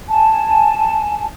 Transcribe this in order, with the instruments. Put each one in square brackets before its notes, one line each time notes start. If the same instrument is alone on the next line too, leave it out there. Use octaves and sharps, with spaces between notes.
[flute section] G#5 A5